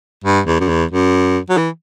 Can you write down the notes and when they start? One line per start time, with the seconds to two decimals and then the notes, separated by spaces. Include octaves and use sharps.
0.24 G2
0.46 E2
0.60 F#2
0.68 E2
0.92 F#2
1.49 F#3
1.57 E3